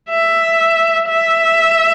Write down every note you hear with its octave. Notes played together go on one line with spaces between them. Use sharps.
E5
E5